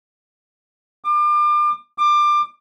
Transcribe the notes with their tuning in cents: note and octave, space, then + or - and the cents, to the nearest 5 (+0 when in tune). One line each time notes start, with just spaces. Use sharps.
D6 +35
D6 +25